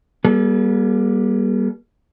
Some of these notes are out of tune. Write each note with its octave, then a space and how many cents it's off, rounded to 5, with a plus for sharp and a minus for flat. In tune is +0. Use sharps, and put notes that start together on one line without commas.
G3 +0 A#3 +45 A4 -45